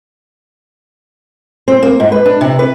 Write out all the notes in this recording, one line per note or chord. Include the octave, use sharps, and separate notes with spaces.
C4
A#3
G#2
B4
D4
C3
B4